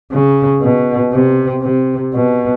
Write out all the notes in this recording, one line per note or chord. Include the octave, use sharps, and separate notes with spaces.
C#3
B2
C3
C3
B2